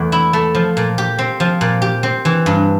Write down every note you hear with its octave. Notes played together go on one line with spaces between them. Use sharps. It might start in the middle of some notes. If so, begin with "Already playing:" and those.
Already playing: E2 A3
E4
A3
F3
A#2
G4
C4
F3
A#2
G4
C4
E3
G2